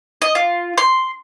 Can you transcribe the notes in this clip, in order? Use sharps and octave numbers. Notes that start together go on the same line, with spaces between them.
D#5
F4
C6